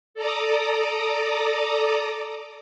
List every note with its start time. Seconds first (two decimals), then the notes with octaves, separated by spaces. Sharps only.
0.14 A4 D5 A#5 D6 D#6